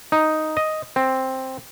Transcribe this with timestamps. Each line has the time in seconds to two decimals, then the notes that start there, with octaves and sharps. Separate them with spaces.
0.12 D#4
0.57 D#5
0.96 C4